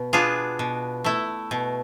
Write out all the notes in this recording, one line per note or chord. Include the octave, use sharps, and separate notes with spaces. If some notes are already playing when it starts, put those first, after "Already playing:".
Already playing: B2
B3 D4 F4 G#4
B2
A3 E4
B2